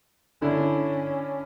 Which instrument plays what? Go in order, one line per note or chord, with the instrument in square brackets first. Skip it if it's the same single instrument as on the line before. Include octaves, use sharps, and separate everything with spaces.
[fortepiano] D3 D4 E4 [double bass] C#4